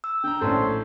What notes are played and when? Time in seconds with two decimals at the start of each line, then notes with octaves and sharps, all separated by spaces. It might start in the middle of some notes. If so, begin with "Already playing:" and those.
0.04 E6
0.24 D3 G5 A#5
0.41 A#1 A2 A3 C#4 C5